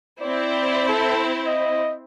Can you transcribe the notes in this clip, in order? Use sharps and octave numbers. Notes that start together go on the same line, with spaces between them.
C4 E4 D5
A4
D#5